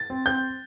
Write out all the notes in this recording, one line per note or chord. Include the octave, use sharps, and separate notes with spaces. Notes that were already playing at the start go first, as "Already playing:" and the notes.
Already playing: A6
C4
C4 G6